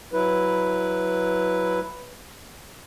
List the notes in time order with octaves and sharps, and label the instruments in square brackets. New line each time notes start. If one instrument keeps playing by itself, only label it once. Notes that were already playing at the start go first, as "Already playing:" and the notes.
[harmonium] F#3 E4 B4